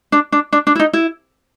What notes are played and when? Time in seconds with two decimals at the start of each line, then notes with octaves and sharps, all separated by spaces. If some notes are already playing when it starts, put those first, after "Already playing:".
0.12 D4
0.32 D4
0.53 D4
0.67 D4
0.75 E4
0.80 D#4
0.93 E4